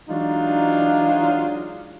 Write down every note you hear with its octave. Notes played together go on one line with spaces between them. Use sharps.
E3 F#3 G#3 D4 D#4 F4